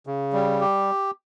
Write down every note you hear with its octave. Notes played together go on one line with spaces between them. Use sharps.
C#3
G3
G4